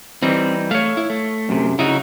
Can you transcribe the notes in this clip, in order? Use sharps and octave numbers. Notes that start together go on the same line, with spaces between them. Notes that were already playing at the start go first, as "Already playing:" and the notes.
E3 G3 C4 D#4
A3 C#5 F5
E4
A3
F#2 C3
C#3 D#4 E4 F#4